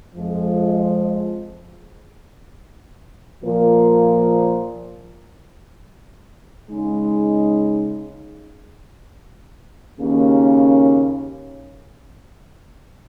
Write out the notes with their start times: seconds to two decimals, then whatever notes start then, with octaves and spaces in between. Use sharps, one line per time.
0.15 F2 F3 G#3
3.43 A#2 F3 A#3
6.70 C#3 G#3 D#4
9.98 D#2 C#3 A#3 C#4